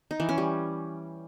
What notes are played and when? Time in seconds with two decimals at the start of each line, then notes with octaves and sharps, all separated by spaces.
0.11 D#4
0.20 E3
0.29 C#4
0.38 G3